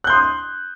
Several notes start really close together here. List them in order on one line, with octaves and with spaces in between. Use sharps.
F#6 G6 C6 D#6